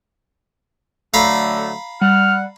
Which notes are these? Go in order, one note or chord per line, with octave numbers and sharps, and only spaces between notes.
D3 F#3 A3 F5 A#5 B5
G3 F#5 F6